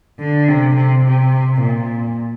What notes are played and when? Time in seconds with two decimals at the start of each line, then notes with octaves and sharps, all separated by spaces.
0.19 D3
0.48 C3
0.76 C3
1.05 C3
1.62 A#2